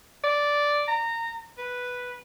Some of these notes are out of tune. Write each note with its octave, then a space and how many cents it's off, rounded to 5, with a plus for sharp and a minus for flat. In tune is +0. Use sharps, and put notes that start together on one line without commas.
D5 -5
A#5 -20
B4 -5